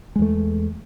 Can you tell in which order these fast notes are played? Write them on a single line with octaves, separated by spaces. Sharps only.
G#3 E2 A3